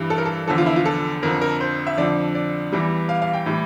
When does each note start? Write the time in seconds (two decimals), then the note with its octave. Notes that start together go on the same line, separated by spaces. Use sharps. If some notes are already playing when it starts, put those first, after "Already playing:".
Already playing: G2 E3 G3
0.10 A4
0.18 A#4
0.25 A4
0.48 E2 D3 F3 A4
0.58 F4
0.66 E4
0.76 F4
0.86 A4
1.23 F2 D3 F3 A#4
1.41 A#4
1.61 C5
1.87 E5
1.97 F2 D3 F3 D5
2.35 D5
2.72 E2 E3 G3
3.09 F5
3.22 F5
3.33 G5
3.46 A2 E3 G3